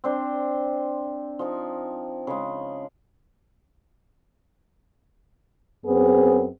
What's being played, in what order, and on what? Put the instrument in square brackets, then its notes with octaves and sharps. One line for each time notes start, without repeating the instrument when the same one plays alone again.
[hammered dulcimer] C4 D4 C5
F3 D#4 G#5
C#3 G#3
[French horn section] F#2 B3 C4 G#4